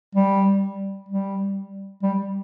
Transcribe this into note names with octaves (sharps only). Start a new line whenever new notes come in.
G3
G3
G3